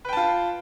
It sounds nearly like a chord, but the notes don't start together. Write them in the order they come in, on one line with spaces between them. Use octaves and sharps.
B4 G5 A5 F4